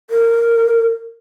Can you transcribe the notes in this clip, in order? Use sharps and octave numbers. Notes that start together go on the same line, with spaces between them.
A#4